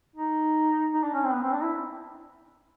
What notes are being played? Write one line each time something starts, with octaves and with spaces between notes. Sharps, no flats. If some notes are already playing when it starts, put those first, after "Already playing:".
D#4
D#4
D4
C#4
C4
B3
C4
D4
E4